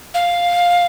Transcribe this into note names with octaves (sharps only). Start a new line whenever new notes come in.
F5